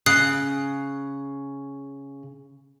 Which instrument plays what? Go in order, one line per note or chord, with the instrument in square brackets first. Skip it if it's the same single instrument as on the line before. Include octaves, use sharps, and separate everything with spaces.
[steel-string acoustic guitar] C#3 [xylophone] D#6 F#6 C7